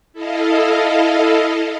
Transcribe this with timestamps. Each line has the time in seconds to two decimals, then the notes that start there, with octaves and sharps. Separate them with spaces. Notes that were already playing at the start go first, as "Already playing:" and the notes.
0.13 E4 A4 D#5 F5